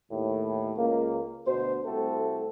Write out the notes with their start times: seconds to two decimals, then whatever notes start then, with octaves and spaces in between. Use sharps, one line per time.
0.11 D#2 A2
0.77 C#2 A#3
1.47 D2 B2 C5
1.85 C2 A3 C4 F#4 A4